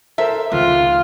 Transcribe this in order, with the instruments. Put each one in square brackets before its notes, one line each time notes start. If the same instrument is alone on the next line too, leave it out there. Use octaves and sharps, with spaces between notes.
[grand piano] A4 A#4 C5 [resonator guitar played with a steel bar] E5
[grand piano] C#2 D#3 [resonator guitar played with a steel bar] C3 [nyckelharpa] F4